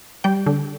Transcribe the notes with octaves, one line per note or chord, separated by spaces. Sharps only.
G3 G5
D3